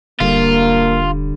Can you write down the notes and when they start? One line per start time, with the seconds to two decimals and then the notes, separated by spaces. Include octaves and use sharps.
0.21 E1 D3 G3 A#3 F4